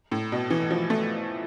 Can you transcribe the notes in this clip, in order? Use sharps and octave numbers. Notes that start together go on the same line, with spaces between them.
A2
B2
E3
F3
A3